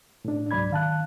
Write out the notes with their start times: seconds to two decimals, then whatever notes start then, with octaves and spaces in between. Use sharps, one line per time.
0.25 A2 D4
0.51 C#2 G#2 F#3 D5 B5 G#6
0.71 D#3 F5 A5 F#6